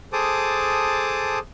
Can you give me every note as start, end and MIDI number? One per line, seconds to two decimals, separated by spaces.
0.13 1.39 68
0.13 1.39 69
0.13 1.39 72
0.13 1.39 81
0.13 1.39 86
0.13 1.39 87